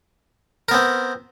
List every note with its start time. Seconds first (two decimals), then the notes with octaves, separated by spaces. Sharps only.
0.69 A#4
0.71 B3
0.74 C4